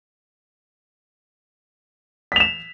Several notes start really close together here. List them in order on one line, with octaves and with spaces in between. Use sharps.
B6 F7 E7